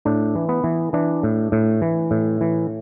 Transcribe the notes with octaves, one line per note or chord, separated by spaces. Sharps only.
A2 D4
E3
B3
E3
E3 D4
A2
A2
E3
A2
E3